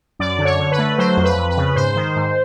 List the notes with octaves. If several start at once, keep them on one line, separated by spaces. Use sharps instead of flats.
F#2 D5
D3
C#5
D3
B4
A3
F#3 C5
F2
B4
F2
B4
C#3
G#2 C5
D#3
G#2